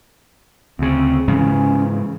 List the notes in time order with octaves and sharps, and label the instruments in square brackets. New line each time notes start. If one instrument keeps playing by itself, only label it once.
[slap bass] D2 C#3 [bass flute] C4
[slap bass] G#2 C#3 E3 [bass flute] C#4